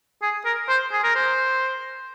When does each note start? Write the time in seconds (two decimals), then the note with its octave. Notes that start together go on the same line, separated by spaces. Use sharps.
0.22 G#4
0.45 A#4
0.69 C5
0.92 G#4
1.04 A#4
1.15 C5